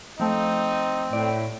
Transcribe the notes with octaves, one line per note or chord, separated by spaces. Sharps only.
F3 A3 C4 D#4
A2 D5